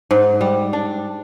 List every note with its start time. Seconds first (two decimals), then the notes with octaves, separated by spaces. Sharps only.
0.11 G#2
0.41 G3
0.73 D4